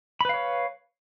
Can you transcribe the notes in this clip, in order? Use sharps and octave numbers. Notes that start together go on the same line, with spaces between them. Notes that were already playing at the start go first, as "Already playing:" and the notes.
B4 C#5 F5 B5